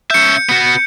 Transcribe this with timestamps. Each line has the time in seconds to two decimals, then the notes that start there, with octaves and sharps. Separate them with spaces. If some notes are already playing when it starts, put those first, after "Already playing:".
0.11 C#4 E5 G6 C#7
0.49 B3 F#4